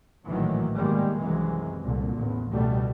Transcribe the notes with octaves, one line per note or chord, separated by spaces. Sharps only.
A#1 A2 D#3 E3 F#3
G#2 B2 D#3 G3 G#3 A#3
C2 F#2 C3 D#3 E3 G#3
C2 A#2 D3
A1 E2
C#2 B2 G3 A3